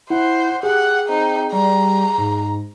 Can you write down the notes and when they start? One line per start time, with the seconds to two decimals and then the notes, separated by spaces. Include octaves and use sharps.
0.10 E4 C5 F#5
0.63 G4 G#4 F#5
1.09 C4 D#4
1.52 G3 A#5
2.18 G#2